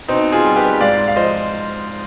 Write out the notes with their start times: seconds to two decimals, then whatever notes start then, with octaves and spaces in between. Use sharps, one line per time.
0.08 B2 C4 D#4
0.32 F4 G#4
0.45 G3
0.56 G4 B4
0.81 G#2 D5 F5
1.08 F5
1.16 F3 C5 D#5